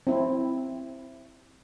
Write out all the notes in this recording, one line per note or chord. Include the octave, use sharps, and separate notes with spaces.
C4 E4